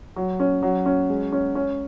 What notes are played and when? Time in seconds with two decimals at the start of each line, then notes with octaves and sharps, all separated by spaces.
0.16 F#3
0.40 C#4
0.62 F#3
0.86 C#4
1.09 G#3
1.32 C#4
1.55 C#4